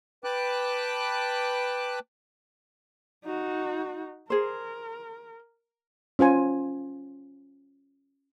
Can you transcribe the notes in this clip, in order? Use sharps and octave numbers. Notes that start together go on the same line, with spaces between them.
B4 G5 A5 D6 F#6
D#4 F#4
G#4 A#4 C5
C#4 F4 C5 G#5